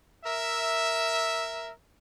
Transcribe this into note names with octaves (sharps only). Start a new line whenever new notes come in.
A#4 E5